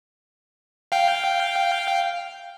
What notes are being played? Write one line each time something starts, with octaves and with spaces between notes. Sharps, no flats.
F5 G5